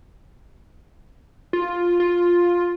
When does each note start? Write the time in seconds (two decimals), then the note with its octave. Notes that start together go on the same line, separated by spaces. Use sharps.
1.53 F4
2.00 F4